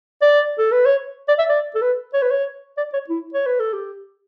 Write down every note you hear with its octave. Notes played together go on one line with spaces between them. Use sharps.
D5
A4
B4
C#5
D5
E5
D5
A4
B4
C#5
B4
C#5
D5
C#5
E4
C#5
B4
A4
G4